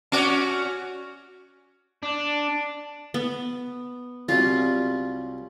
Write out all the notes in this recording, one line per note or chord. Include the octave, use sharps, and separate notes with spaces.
C#4 F#4 D5
D4
B3
C2 F#3 G3 F4